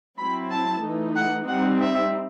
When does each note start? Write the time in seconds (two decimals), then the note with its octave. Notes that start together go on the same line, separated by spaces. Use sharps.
0.18 F#3 C4 E4 B5
0.51 A5
0.83 E3 A3 D#4
1.15 F#5
1.47 G3 C4 D#4 F#5
1.79 E5